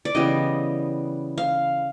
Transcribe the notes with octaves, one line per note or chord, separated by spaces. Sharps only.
D5
C#3 E3 G3 B3 D#5
F5